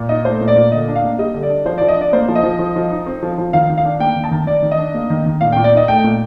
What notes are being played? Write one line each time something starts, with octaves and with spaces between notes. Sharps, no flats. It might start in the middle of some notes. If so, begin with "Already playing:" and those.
Already playing: A#2
D#4 D#5
A3 C5
A#2
D5
A#2
D3 D#5
D4
F5
A#3
G3 D#5
D3
D5
D4
F3 C5
D5
F3
D#5
D4 D5
A#3 C5
F3
D#5
F3
F3
F3
D#4
C4
F3
F3
D#3 F5
D#3
F5
D4
A#3 G5
D#3
A5
D#3
D#3 D5
D#3
D#5
D4
A#3
D#3
D#3
A#2 F5
G5
A#2
D5
D#4 D#5
A3 G5
A#2